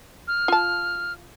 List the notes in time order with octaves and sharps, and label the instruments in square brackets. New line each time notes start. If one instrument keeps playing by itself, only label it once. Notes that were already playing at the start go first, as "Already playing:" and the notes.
[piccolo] F6
[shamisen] F4 A5